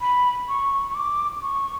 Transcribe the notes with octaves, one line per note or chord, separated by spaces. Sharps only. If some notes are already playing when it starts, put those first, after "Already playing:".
B5
C#6
C#6
D6
C#6